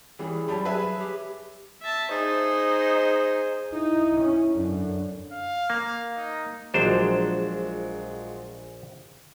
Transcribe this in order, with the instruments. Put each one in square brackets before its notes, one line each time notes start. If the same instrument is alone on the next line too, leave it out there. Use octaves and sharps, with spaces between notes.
[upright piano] E3 G3 C#4 [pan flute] G#4
[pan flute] F#3 [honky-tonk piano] G3 [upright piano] C#5 A5 B5
[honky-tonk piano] G#4 B4 E5 [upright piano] B5
[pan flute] G4
[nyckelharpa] E5 A5
[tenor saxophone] D#4 [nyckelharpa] G#4 C5
[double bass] D#4 [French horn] E4
[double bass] C#4
[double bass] F#2 [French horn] D3
[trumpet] F5
[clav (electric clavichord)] A#3
[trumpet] D#4
[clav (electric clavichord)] A#1 D4 C5 [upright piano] F3 F#3 G#3